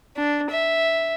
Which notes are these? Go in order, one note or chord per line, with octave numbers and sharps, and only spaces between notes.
D4
E5